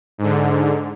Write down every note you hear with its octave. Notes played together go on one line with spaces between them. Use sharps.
G#2 D3